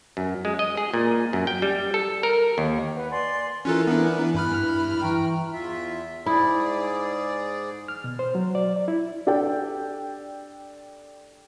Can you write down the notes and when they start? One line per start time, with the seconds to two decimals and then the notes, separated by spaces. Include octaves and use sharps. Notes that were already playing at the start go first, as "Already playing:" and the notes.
0.17 F#2
0.45 G#3
0.59 D#5
0.77 G#4
0.94 A#2
1.33 F#2
1.47 G5
1.62 G3
1.94 A4
2.23 A#4
2.58 D#2
2.95 B4 F#5
3.10 D5 G#5 C6
3.65 E3 C#4 F4 A4 A#4 G#5 F#6
3.87 B3 D4
4.35 G2 E4 B5 F6 F#6
5.02 E3 G5 A#5 C#6
5.53 E2 F4 E5
6.26 G#2 E4 G#4 D5
7.88 F6
8.04 B2
8.19 C5
8.35 F#3
8.55 D5
8.76 D5
8.88 E4
9.27 D4 G4 A4 D5 G5